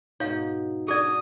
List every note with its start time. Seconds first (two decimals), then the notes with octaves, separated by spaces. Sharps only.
0.20 G#2 B2 D#4 C#5 F5
0.88 D4 F#4 G#4 D5 D#6